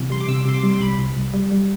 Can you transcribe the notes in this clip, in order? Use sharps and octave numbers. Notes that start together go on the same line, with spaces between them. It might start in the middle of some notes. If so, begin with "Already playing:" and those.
Already playing: C3 E3
G3 C6
D6
C3 E6
C3 C6
D6
G3
C6
C2 B5
C2
C2
G3
G3